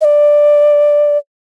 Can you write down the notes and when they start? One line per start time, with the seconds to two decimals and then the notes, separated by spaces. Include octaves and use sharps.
0.01 D#5
0.05 D5